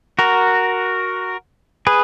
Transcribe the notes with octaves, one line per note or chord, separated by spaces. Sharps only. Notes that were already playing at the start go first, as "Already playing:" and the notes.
F#4 A#4
G#4 B4